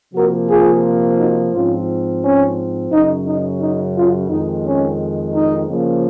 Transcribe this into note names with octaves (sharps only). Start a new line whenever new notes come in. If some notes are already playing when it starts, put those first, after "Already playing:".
C3 F3 A#3 F#4 A#4
F4 G#4
D#4 F#4
G#2 F3 C4 C#4 F4
C#4
F#2 C#3 F#3 D#4
D#4
D#4
C#4 F4
F2 D#3 G#3 D#4
C#4
D#4
C#3 F3 A#3